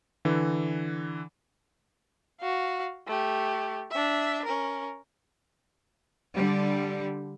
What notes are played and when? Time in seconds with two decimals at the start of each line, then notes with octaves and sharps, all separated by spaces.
0.25 D3 E3
2.40 F#4 F5
3.07 A3 G4
3.91 D4 E5
4.45 C#4 A#4
6.34 D3 G3